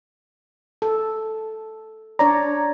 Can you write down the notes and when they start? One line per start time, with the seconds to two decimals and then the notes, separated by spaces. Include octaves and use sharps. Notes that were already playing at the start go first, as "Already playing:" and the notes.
0.82 A4
2.19 D4 C#5 D5 A#5